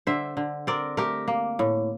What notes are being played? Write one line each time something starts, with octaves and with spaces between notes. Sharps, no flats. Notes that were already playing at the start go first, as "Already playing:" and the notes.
D3 C5 E5
D3
C4 A#4 D5
A3 G4 A#4
A#3
A2